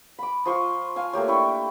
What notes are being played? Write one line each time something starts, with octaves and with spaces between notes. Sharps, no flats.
B5 D6
F3 C6 C#6
F5 G#5
A3 A#3 G4 C#5
D4 E4 G5 C#6